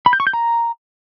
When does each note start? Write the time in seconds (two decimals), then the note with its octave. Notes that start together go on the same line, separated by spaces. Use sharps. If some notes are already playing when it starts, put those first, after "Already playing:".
0.06 B5
0.13 G6
0.20 C#6
0.27 G6
0.33 A#5